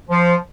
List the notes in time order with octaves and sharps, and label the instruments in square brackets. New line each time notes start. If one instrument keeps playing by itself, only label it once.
[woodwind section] F3